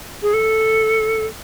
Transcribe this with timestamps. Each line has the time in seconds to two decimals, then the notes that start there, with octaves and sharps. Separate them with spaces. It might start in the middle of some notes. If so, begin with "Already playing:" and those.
0.22 G#4
0.33 A4